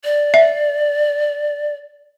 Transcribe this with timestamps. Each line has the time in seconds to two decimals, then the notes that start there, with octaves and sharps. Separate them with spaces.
0.04 D5
0.34 E5